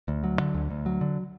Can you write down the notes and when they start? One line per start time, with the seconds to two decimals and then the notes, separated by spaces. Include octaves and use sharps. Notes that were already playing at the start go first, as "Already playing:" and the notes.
0.08 D2
0.24 F#3
0.40 D3
0.54 D2
0.71 D2
0.86 F#3
1.01 D3